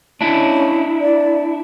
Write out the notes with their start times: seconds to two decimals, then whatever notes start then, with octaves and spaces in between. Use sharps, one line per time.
0.21 C#4 D4 E4
1.00 D5